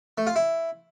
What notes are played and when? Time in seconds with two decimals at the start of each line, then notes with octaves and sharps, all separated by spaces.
0.18 A3
0.27 F4
0.36 E4